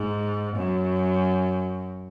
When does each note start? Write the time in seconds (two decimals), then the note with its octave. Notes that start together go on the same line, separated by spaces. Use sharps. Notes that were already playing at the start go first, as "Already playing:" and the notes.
Already playing: G#2
0.56 F#2